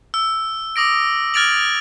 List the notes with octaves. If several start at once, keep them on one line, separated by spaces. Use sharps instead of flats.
E6
D6 D#6 A#6 D7
F6 G#6 A6 D7 F7 F#7